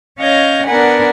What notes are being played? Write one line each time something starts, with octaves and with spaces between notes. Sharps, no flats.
C#4 C#5 D#5 F5 G6 A#6
B3 D4 A#4 B4 F#5 G#5